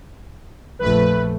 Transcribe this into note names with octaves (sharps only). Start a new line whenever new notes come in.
A#1 F2 A3 B4